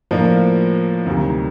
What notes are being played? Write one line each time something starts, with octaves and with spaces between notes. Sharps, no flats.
A2 F3 A#3 D4 F4
D2 C3 D#3 F#3